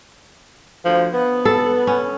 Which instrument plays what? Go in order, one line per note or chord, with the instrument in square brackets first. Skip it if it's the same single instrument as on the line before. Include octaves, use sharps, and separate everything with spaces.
[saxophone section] D2 F3
B3
[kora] A4
C#4